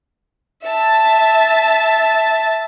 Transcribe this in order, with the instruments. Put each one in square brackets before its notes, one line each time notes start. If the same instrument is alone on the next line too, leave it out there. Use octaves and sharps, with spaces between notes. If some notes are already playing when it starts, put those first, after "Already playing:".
[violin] E5 A5